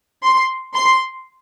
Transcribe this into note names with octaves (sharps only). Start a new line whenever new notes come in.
C6
C6